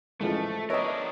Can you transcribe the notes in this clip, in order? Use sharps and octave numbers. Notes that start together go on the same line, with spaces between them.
A1 E3 F3 G#3 A3
D4 A#4 B4 C#5 D#5 E5 A#5